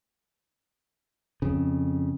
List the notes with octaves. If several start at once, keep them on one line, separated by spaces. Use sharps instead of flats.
F2 C#3